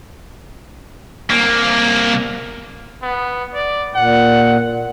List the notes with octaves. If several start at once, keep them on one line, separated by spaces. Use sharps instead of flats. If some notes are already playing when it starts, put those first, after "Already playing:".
C2 A#3
B3
D5
A#2 F#5